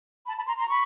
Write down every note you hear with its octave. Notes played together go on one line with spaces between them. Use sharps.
A5 B5
A5 B5
A#5 C6
A#5 C6
B5 C#6